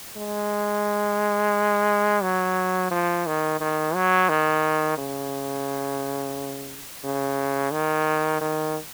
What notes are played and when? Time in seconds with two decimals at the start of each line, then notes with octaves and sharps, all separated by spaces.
0.17 G#3
2.23 F#3
2.91 F3
3.27 D#3
3.61 D#3
3.95 F#3
4.29 D#3
4.98 C#3
7.04 C#3
7.72 D#3
8.41 D#3